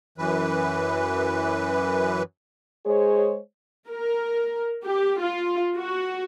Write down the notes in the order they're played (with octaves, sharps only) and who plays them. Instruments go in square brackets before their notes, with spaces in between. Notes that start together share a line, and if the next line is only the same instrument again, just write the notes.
[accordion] F#2 E3 B4
[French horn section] G#3 C5 C#5 [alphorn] G#4
[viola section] A#4
G4
F4
F#4